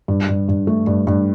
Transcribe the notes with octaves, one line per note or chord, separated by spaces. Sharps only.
G2
G2
G2
A3
G2
G2